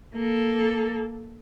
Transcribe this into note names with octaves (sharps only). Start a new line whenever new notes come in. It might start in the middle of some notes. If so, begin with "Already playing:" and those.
A#3 A4